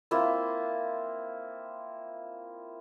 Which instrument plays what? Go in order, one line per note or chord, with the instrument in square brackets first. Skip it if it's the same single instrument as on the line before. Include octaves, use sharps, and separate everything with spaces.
[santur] A#3 C4 E4 F4